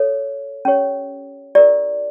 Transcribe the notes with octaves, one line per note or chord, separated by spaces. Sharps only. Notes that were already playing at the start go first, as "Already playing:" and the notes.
Already playing: A4 C#5
C#4 G4 C#5
E4 G4 A#4 D5